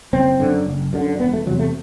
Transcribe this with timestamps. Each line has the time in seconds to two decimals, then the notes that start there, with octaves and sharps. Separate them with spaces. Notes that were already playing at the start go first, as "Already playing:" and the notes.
0.13 F#1 C4
0.39 F#2 D3
0.66 F#1
0.93 F#2 D3
1.19 E1 B3
1.33 A3
1.46 E2 C3 F#3
1.59 A3